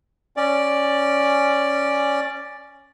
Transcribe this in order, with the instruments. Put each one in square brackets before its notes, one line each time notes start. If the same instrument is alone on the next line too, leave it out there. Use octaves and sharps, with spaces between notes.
[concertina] C#4 D5